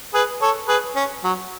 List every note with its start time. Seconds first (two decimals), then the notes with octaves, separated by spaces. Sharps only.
0.14 G#4 B4
0.42 A4 C#5
0.68 G#4 B4
0.96 C#4
1.24 F#3